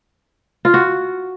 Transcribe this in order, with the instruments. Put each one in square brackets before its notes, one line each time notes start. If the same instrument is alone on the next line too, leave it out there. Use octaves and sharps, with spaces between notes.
[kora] F4
F#4